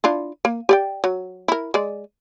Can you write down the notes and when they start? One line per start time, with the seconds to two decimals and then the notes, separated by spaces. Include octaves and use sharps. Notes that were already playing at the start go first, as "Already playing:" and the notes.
0.04 D4 E4 F4
0.45 A#3
0.69 G4 D5 G5
1.04 F#3
1.48 E4 A#4
1.74 G#3 D5